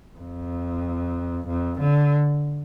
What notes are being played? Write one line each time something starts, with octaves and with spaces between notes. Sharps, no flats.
F2
F2
D3